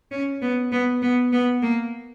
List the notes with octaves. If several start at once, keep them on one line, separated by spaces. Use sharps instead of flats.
C#4
B3
B3
B3
B3
A#3